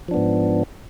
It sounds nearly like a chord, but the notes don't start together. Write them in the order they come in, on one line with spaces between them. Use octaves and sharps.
F3 D4 B3 G#2